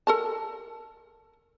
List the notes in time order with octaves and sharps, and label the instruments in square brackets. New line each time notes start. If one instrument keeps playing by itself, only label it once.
[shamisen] A4 A#4 A5